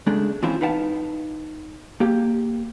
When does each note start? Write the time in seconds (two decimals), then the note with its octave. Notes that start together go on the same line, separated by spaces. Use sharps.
0.07 C#3 G#3 A3 D4
0.43 E3 F3 C4 C#4 E4 F4
0.61 D#4 B4 F5 F#5 A5
2.00 A#3 G4